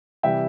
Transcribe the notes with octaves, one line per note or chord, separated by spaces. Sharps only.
C3 E3 G3 E5 G5